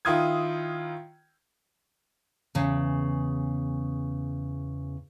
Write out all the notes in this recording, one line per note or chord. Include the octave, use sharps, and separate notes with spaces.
D#3 E4 F4 D#6 G#6
E2 C#3